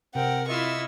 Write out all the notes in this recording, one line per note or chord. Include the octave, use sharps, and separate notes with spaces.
C3 C4 A#4 F#5 G5
E4 F4 D#5 E5 C#6 E6